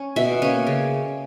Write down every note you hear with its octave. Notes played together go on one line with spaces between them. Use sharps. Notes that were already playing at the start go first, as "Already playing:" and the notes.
Already playing: C#4
B2 E5
A#3 C#4
C#3